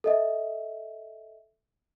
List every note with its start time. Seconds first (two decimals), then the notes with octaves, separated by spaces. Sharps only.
0.04 A4 D#5 E5